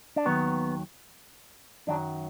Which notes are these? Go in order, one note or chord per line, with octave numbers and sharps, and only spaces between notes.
D4
D#2 D#3 F#3 B3
F#2 D#3 F#3 D4